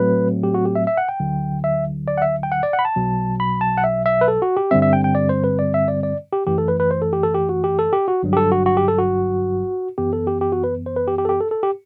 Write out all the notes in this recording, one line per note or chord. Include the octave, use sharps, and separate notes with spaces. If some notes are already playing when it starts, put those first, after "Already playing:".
Already playing: A2 F#3 A3 C4 B4
G4
F#4
G4
E5
E5
F#5
G5
D2 D3 F#3
E5
D5
F#5
E5
G5
F#5
D5
F#5
B5
A5
B1 B2 F#3
B5
A5
F#5
E5
E5
B4
A4
F#4
G4
G2 D3 G3 C4 E5
E5
G5
G5
D5
C5
B4
D5
E5
D5
D5
G4
F#2 E3 A3 G4
A4
B4
B4
C5
A4
G4
A4
G4
F#4
G4
A4
G4
F#4
G1 G2 F#3
G4
A4
F#4
F#4
G4
A4
F#4
F#2 E3 B3 G4
A4
G4
G4
F#4
B4
C5
B4
G4
G4
A4
G4
A4
A4
G4